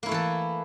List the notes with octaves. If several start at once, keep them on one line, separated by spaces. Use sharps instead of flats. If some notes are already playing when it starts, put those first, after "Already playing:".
E3 A3 A#3 E4 A4